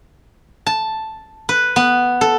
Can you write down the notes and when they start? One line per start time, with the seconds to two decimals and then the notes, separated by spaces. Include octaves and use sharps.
0.67 A5
1.49 B4
1.76 B3
2.21 A4